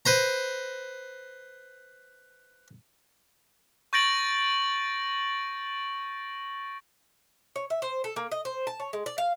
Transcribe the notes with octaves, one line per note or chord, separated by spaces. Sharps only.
B4 C5 A#5
C#6 G6 A6 A#6 D7 F#7
C#5
E5
C5
A4
A#3
D#5
C5
A5
C#5
G#3
D5
F5